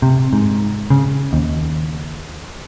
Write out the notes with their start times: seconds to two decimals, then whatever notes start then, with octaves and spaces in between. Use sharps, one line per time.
0.02 C3
0.33 G#2
0.90 C#3
1.33 D#2